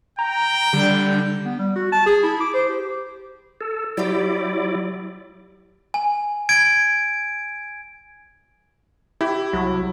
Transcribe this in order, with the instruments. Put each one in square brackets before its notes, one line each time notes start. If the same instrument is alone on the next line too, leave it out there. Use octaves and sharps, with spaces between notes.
[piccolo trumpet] G5 [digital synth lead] A#5
[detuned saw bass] D3 [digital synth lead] G3
[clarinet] B3
G3
F#4
A5
G#4
E4
D6
C5
G4
[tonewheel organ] A4
[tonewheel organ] F#3 E4 D5 [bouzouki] G4 C5 G5
[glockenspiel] G#5
G#6 D7
[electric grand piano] E4 [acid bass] G4
[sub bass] C2 [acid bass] F#3